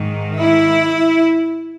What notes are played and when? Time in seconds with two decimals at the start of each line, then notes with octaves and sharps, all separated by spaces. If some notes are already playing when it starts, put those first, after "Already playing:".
Already playing: G#2 D#3
0.38 E4